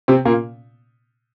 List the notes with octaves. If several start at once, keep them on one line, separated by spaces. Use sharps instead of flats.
C3 C4
A#2 A#3